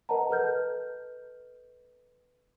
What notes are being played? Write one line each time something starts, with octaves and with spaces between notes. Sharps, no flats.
A#4 B4 D#5 F#5 A5 A#5
A4 B4 D#5 F6 G6